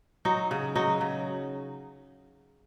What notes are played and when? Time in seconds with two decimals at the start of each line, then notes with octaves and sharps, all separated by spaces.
0.25 F#3 D#4
0.51 C#3
0.76 F#3 D#4
1.01 C#3